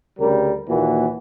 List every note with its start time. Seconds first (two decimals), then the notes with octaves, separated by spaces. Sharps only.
0.20 D2 C#3 G3 A#4
0.69 D#2 A#2 E3 A#3 F#4